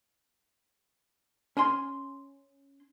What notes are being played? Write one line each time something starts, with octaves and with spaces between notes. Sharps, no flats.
C#4 G#5 C6